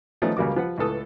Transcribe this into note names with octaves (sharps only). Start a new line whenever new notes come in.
D#3 F3 A3 B3 C#4 D#4
C#2 C#3 G3 A#3 F#4 D6
F3 B4 F#5
C#2 A2 B3 A4 D#6